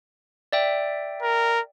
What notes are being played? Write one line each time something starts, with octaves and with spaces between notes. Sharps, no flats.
D5 E5 G5
A#4